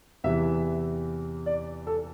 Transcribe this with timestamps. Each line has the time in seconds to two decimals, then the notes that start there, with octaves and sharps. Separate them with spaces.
0.24 E2 C3 E3 E5
1.46 D5
1.87 A4